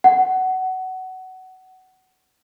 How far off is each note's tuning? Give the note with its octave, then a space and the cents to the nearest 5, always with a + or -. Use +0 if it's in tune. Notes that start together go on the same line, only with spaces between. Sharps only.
F#5 +20